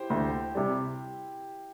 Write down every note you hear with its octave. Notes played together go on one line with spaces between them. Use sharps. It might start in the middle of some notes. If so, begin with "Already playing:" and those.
Already playing: E4 G4 C5
D2
C3 G3